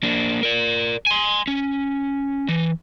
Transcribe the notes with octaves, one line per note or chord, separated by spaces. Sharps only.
A#3 D4
A#4 D5
G#5 C6
C#4
E3